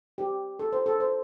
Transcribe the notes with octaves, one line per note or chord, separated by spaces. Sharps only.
G4
A4
C5
A4
C5